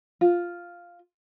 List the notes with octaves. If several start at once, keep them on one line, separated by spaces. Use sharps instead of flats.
F4